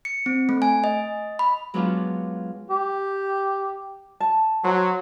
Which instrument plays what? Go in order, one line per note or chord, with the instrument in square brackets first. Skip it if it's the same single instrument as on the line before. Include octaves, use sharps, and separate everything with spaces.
[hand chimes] C#7
C4
A3
G#5
D#5
B5
[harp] F#3 G#3 B3 C#4 D4 F4
[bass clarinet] G4
[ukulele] A5
[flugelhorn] F#3 [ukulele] C5 F#5